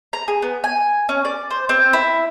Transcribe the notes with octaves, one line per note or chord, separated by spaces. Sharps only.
A#5
G#4
B3
G#5
C#4
D5
C5
C4
E4